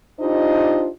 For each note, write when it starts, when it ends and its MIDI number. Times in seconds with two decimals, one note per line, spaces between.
0.20 0.89 62
0.20 0.89 63
0.20 0.89 65
0.20 0.89 67
0.20 0.89 72
0.20 0.89 75